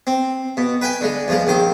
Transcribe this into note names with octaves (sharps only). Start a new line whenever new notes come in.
C4
B2
B4 G5 G#5
D3 G#3
E2 F3 G#3
A#1 D#3 C5